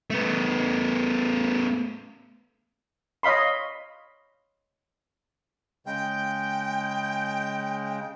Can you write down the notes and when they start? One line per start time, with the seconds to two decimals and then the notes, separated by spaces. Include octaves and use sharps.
0.10 A3 B3
3.23 C#5 D#5 F5 B5 C6
5.86 C#3 G#3 G5